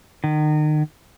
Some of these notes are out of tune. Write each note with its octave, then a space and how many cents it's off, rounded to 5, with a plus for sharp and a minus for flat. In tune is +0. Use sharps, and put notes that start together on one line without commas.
D#3 -35